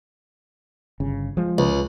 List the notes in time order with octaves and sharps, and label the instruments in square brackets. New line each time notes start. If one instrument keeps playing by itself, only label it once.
[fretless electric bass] G1 C#3
F3 G#3
[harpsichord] C#2